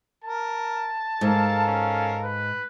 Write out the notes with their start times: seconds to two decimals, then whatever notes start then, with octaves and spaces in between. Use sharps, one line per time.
0.24 A#4 A5
1.21 G#2 A4 A#4 F5
1.67 C#4
2.23 B4